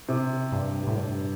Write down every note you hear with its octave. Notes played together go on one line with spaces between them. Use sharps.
C3
G2
A2
G2